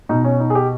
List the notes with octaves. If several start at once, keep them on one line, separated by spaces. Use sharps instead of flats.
B2 D#4
C#4
D#4
G#4
G4